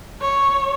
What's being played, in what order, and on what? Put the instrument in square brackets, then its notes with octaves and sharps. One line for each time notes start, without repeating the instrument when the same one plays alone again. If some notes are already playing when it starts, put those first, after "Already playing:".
[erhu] C#5